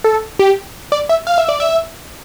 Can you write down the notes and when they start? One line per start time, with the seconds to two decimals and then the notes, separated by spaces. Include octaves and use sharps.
0.04 A4
0.39 G4
0.92 D5
1.09 E5
1.27 F5
1.38 E5
1.49 D5
1.60 E5